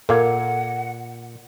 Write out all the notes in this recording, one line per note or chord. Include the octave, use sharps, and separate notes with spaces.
A#2 A4 A#4 F5 F#5 D6 G#6